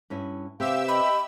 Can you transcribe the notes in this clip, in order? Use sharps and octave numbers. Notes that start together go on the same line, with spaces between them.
G2 C#4 E4
C3 C4 G4 B4 E5 F5 E6
D#5 B5